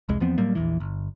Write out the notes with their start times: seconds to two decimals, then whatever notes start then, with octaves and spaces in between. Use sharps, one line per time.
0.09 F1 C2 G#3
0.20 E2 F3 B3 C4
0.38 A2 F#3 G3 A#3
0.55 A#1 E2 E3
0.80 G1